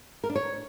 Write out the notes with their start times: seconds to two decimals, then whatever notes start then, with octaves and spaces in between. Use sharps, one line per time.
0.24 A#4
0.30 D4
0.36 C#5